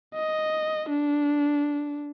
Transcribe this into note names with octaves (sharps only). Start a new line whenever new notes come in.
D#5
D4